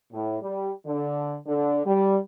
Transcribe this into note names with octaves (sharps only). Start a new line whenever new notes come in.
A2
G3
D3
D3
G3